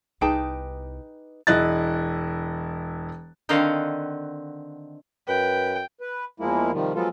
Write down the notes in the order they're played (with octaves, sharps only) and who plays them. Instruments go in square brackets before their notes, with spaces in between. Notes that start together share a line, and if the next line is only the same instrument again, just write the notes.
[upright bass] C2 B3 [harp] D#4 B4 D6 [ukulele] G#4 G5 A5
[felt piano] E1 E4 D#5 F#6 A6
[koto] D3 D#3 C4 D#5 F5 F#5
[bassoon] F#2 [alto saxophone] B4 [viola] G5
[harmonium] B4
E2 F3 G#3 A#3 E4
C3 D#3 F3 G3
F3 F#3 G#3 B3 F4 A4